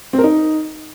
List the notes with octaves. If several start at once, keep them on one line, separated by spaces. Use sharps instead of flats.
C4
A#4
D#4